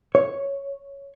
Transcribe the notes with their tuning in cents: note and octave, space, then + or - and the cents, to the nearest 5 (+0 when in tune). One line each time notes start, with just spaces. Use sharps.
C#5 +0